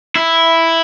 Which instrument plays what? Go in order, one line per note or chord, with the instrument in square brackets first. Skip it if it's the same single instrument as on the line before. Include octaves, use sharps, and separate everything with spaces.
[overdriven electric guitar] E4